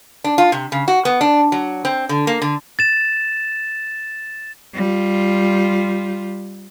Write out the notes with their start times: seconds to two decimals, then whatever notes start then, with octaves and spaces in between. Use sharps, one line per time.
0.24 D4
0.38 F4
0.52 C3
0.72 C#3
0.88 F#4
1.05 B3
1.21 D4
1.52 F#3
1.85 C4
2.09 D3
2.27 A#3
2.42 D3
2.79 A6 E7
4.74 G3 F4